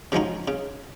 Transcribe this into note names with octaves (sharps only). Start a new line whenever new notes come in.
C#3 F3 G#3 D#4 F#4
C#3